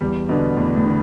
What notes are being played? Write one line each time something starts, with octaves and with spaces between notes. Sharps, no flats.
E2 G3
B2 D3 B3 D4
E2 A2
A2
D3 B3